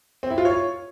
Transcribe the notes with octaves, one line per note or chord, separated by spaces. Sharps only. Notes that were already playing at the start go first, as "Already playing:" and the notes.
C4
E4
F4
C#5